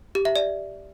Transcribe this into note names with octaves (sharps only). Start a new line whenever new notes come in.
G4
E5
D5